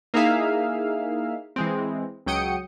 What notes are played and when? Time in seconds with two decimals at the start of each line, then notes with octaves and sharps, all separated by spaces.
0.14 A#3 D#4 E4 G#4 E5 F5
1.56 E3 G#3 C4
2.26 C#2 F#3 G5 D#6 C#7